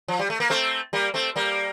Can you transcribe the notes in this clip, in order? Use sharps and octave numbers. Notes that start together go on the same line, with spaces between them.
F3
G3
A3
A#3
A3 C4
G3 A#3
A3 C4
G3 A#3